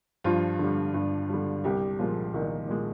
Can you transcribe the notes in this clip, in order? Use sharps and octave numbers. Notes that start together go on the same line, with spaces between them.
G2 F3 F4
D3 G3
G2
D3 G3
C2 G3 G4
A#2 F3 G#3 F4
C2 D#3 D#4
A#2 G#3